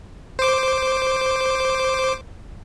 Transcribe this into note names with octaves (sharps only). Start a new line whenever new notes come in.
C5 D6